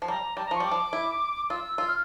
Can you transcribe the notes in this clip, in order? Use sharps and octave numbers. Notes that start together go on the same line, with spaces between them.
F3
G3 A#5
G3 A5
A#5
F3 C#6
G3 D6
F3
E4
F4 E6
F4 E6
F6